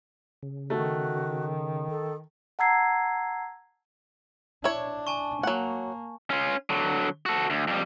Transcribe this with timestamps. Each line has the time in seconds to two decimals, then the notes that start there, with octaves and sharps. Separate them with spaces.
0.43 C#3
0.70 D#3 A3 F#4
1.90 A4
2.59 F#5 A5 A#5 E6 G#6 C7
4.64 D4 E4 C#5
5.07 G#5 A5 C#6
5.43 F#3 A#3 F#5
6.30 C#4 F4
6.70 D3 F#3
7.26 F#4 A4
7.50 D2
7.68 F2 G3